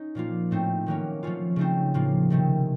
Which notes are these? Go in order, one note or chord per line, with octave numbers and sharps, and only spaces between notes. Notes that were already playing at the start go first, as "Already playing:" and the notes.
Already playing: C#4 D#4
A#2 F3 A#3 F4
A2 A3 C4 D#4
D#3 F#3 A#3 C#4
F3 A3 C#4 F4
C#3 A3 C4 D#4
A2 F3 A#3 F4
C3 D#3 A3 C4